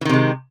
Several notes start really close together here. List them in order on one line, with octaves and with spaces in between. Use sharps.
E3 D#3 C3 G#3